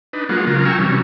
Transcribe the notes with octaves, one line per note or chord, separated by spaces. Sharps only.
D4 D#4 B4
F#3 G#3 A#3 F4 F#5
C#3 F#3 F4 A#4
G5 G#5 A#5 C#6 E6 F6
C3 E3 F#3 G3 C#4